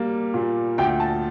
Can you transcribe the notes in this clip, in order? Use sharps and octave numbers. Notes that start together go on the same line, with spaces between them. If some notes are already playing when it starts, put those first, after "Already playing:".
Already playing: G3 A#3
A#2
D2 G5
A5